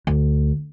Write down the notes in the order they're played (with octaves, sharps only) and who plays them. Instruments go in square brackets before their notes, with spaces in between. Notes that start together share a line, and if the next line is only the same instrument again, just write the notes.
[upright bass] D2